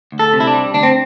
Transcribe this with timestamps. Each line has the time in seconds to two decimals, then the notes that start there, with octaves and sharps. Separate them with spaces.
0.12 D2
0.19 A4
0.33 C3
0.40 E4
0.47 D4
0.54 G3
0.74 D2 D4
0.83 C4